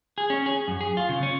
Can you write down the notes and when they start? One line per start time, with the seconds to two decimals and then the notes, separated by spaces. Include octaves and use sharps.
0.18 G#4
0.30 C#4
0.46 G#4
0.68 F#2
0.81 G#4
0.97 F4
1.09 C#3
1.23 C#4